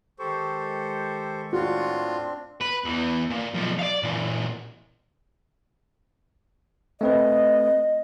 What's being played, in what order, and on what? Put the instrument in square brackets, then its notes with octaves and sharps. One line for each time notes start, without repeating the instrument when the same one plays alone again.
[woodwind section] D#3 G#3 C#6 [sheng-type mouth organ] G4 A4 C5
[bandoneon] A2 F4 [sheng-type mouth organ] C4 D4 [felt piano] F#4
[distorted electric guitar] B4
E2 E3
A#2
B1 F3
D5 F5
A#2 E3
[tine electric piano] A3 C4 B4 [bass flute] D#5